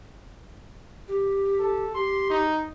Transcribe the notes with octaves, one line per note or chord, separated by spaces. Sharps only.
G4
A4
G4 C6
D#4